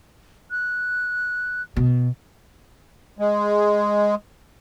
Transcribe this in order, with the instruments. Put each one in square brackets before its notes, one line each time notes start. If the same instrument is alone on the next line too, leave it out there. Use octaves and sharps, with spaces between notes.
[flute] F#6
[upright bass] B2
[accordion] G#3